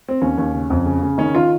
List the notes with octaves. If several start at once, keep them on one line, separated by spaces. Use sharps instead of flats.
C4
D#2 C#4
D#2
C#3
F2
C#3
C#3
D#3 C#4
D#3 F4